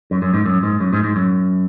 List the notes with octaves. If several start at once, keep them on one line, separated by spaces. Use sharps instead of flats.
F#2
F#2
G#2
F#2
G#2
F#2
G#2
G#2
F#2